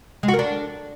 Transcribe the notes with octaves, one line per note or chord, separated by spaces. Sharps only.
G#3
F#4
A#4
D4